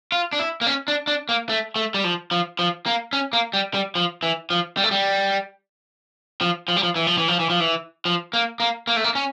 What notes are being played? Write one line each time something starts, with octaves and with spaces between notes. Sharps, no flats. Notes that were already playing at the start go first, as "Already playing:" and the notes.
F4
D4
E4
A#3
C#4
D4
D4
A#3
A3
A3
G3
F3
F3
F3
A#3
C#4
A#3
G3
G3
F3
E3
F3
G3
A3
G3
F3
F3
G3
F3
E3
F3
E3
F3
E3
F3
E3
F3
A#3
A#3
A#3
A3
A#3
C#4